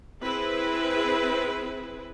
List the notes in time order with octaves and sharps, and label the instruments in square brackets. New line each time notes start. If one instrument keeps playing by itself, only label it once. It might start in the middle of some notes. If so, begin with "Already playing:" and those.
[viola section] C4 E4 G#4 B4